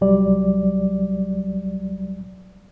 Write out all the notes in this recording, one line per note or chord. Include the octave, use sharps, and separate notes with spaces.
C2 F#3 G3 D5